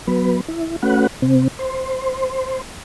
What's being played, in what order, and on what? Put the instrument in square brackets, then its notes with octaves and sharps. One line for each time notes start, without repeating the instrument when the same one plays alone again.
[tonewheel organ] F#3 B3 B4
E4
A3 C#4 F#4 B4 F#5
C3 C4
C5